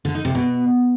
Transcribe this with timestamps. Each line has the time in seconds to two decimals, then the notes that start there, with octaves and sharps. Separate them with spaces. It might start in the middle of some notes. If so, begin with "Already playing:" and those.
0.05 D3
0.15 D#4
0.25 C3
0.35 B2